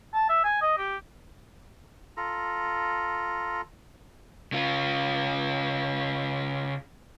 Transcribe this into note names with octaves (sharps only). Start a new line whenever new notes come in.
A5
E5
G#5
D#5
G4
F4 A4 A#5
C#3 F4